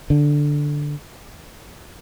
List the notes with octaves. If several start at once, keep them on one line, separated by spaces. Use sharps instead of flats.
D3